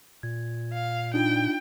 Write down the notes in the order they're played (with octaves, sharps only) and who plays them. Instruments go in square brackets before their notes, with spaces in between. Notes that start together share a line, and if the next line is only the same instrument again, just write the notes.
[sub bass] A#2 [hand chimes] G#6
[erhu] F5
[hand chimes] D4 D#4 F4 [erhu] G5